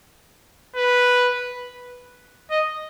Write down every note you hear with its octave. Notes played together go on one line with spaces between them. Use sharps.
B4
D#5